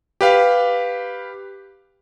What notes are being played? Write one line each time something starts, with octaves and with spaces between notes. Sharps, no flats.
G4 B4 F5